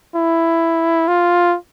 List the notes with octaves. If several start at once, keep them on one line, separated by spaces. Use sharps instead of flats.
E4
F4